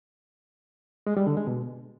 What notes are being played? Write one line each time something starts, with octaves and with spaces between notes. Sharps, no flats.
G#3
G3
D3
G#3
B2